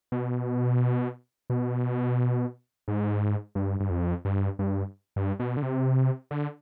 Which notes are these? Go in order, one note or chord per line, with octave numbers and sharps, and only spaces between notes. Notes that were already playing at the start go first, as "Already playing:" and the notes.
B2
B2
G#2
G2
G2
F2
G2
G2
G2
B2
D3
C3
D3